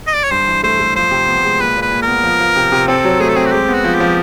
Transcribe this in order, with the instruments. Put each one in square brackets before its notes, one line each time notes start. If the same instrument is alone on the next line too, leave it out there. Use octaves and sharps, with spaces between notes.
[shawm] D#5
D5
C#5
[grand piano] G2 [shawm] C5
[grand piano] E3
[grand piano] A3 [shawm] C5
[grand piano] A3
[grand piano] F3 [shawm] C5
[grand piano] C3
B3
G#3
[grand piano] A#2 [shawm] B4
[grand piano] A#2
[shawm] B4
[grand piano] A#2
[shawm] A#4
[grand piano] B3
F3
F3
C3
C3
[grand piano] C4 [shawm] A4
[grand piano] F#3
[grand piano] A3 [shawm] G#4
[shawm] A4
[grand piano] C4 [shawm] G#4
[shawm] F#4
[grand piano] G#3 [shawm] G4
[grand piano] B3
[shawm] F#4
[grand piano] F3
[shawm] G4
[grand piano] F3